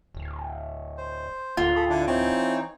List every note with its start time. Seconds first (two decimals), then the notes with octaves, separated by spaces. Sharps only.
0.15 D1
0.97 C5
1.57 D1 D3 A#3 F4
1.76 G#4 A4 B5
1.89 D3 D4 E4
2.07 E3 C4 D#4 C#5